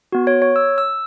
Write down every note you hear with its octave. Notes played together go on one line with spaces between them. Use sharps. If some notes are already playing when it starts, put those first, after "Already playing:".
B3 F#4
C#5
C#5
E6
E6